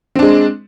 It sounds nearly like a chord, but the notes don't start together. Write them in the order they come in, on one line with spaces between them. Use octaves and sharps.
C4 D4 G#3